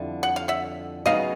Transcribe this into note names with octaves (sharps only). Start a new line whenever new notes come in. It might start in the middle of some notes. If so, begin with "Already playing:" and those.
Already playing: F2 D3 G3 E4
F#5
F5
E5 F#5
C#3 F#3 B3 D#4 D#5 F5